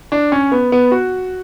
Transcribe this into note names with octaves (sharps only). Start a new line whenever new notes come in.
D4
C#4
B3
B3
F#4